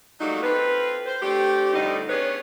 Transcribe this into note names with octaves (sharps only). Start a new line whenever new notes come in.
F#3 G3 A3 A#3 D#4 F#4
C4 F4 A4 B4
C5
A3 C4 D4 G4
F2 A2 D3 G3 D#4
B3 C#4 D4 G#4 B4 C#5